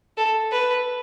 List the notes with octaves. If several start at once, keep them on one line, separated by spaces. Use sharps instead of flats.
A4
B4